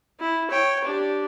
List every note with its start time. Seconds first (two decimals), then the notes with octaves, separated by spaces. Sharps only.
0.20 E4
0.50 C#5 G5
0.84 D4 G4